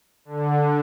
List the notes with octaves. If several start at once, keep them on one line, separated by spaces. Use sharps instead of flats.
D3